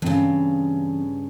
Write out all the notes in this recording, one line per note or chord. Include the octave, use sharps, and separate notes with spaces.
G2 C#3 E3 C4